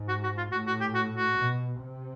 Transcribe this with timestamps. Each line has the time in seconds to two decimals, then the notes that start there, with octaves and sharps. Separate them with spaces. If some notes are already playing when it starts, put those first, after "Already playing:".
Already playing: G#2
0.09 F#4
0.23 F#4
0.37 F4
0.52 A2 F#4
0.67 F#4
0.81 G4
0.95 F#4
1.17 F#4
1.38 B2
1.82 C3